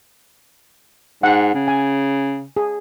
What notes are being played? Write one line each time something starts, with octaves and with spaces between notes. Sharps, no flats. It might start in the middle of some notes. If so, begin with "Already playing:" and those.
G#2 F#5 G5
C#3
G#5
G#4